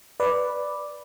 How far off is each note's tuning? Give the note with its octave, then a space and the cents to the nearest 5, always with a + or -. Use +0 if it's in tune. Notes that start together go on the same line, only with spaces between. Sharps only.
B4 +0 D5 +0